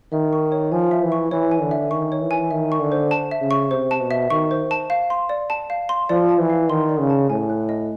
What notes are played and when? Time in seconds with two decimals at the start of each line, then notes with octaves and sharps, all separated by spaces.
0.12 D#3 E5
0.33 C#6
0.52 C#5
0.72 F3 G#5
0.91 E5
1.02 E3
1.12 C#6
1.31 E3 C#5
1.51 G#5
1.62 D3
1.71 E5
1.91 D#3 C#6
2.12 C#5
2.21 E3
2.31 G#5
2.51 D#3 E5
2.72 C#6
2.81 D3
2.92 C5
3.11 A5
3.31 E5
3.41 C#3
3.51 C#6
3.71 C3 C5
3.91 A5
4.00 B2
4.11 E5
4.30 D#3 C#6
4.51 C5
4.71 A5
4.90 F5
5.10 C6
5.29 D5
5.50 A5
5.70 F5
5.89 C6
6.09 F3 D5
6.29 A5
6.40 E3
6.50 F5
6.70 D#3 C6
6.89 D5
7.00 C#3
7.10 A5
7.29 A2 G#5
7.49 F#6
7.69 D#5